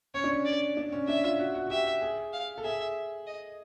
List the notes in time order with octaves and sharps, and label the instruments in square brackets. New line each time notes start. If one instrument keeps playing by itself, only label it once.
[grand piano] C#4 [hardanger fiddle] C#5
[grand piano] D4
C#4
[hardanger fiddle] D5
[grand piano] D4
C#4
[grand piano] D4 [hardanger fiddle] E5
[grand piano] F4
F#4
F#4
F#4
[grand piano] G4 [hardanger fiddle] E5
[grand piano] G#4
[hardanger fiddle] F5
[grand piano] A4
[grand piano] G#4 [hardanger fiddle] E5
[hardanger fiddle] D#5